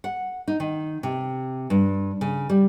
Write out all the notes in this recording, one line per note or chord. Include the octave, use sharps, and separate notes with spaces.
F#5
D#4
D#3
C3
G2
C#3
G3